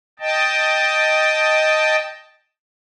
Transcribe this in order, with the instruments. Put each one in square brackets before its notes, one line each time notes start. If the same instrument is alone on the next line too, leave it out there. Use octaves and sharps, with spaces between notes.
[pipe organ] D#5 G5 A5